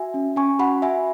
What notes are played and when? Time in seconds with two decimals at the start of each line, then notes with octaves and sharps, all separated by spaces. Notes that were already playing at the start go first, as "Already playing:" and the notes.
Already playing: F#4 E5 G#5
0.14 C#4
0.36 C#4 G#5 C#6
0.59 F#4 F#5 B5
0.82 F#4 E5 G#5